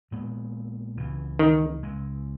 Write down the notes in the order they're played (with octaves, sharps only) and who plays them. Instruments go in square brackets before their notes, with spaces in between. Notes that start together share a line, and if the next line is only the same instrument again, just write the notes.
[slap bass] A#1 A#2 G#3 B3
C#2 C#3 E3
[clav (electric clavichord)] D#3
[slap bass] C#2 C#3 G#3